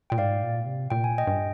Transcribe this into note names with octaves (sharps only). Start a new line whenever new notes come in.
A#2 G5
G#2 D5 F5
A#2
C3
A#2 G5
G#5
D#5 G5
G2